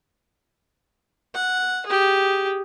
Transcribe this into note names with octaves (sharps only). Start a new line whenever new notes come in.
F#5
G4 G#4